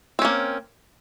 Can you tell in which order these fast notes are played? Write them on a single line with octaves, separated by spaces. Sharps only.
C4 C#4 A#3